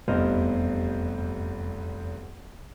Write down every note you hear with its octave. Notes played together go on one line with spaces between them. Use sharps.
F1 E2 G2 C5 D#5 F6